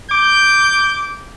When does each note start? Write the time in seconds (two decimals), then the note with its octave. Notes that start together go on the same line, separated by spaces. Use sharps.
0.11 D6 G6